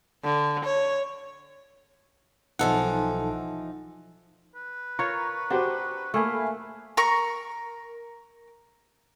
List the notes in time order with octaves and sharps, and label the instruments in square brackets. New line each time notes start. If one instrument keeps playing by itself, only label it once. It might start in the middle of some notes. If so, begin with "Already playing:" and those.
[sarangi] D3
C#5
[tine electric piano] B1 A4 F#5 [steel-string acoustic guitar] E3 F3 D#4
[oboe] B4
[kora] F4 A#4 C#5 [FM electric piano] A#5 C#6
[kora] D4 [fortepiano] F#4 G4 C5
[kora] A3 A#3 [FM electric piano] E5 G#5 B5 [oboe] F5
[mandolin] A#4 A#5 C#6